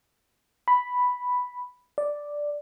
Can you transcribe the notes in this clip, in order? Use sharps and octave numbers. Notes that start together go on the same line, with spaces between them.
B5
D5